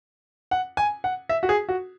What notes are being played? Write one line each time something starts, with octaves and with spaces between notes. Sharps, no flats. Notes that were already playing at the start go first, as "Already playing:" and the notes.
F#5
G#5
F#5
E5
F#4
G#4
F#4